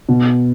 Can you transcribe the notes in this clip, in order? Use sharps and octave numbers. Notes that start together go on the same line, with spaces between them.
B2